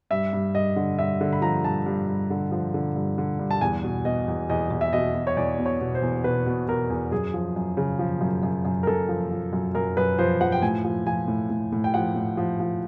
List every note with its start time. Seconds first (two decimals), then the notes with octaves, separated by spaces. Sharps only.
0.10 G2 E5
0.33 G2
0.54 G2 D#5
0.76 D3
0.99 G2 E5
1.21 D3
1.33 B5
1.42 F3 A#5
1.64 G2 A5
1.86 G2
2.08 G2
2.30 D3
2.52 F3
2.74 D3
2.95 G2
3.18 D3
3.39 G2
3.51 A5
3.61 E2 G#5
3.84 B2
4.05 B2 D#5
4.28 E2
4.50 E2 D#5
4.71 E2
4.81 E5
4.93 B2 D#5
5.14 B2
5.27 C#5
5.37 E2 D5
5.58 B2
5.66 C#5
5.81 B2
5.95 C5
6.02 E2
6.24 B2 B4
6.46 B2
6.68 B2 A#4
6.90 E2
7.11 F#2 G#4
7.34 F3
7.56 F#2
7.77 C#3
7.99 F3
8.21 F#2
8.43 F#2
8.65 F#2
8.83 A#4
8.87 F#2 A4
9.09 F3
9.31 F3
9.53 F#2
9.75 F#2 A#4
9.97 F#2 B4
10.19 F3 C5
10.41 F3 F#5
10.52 G5
10.62 A2 G#5
10.85 F3
11.06 F3 G#5
11.28 A2
11.50 A2
11.72 A2
11.84 G5
11.94 F3 F#5
12.16 A2
12.37 F3
12.60 F3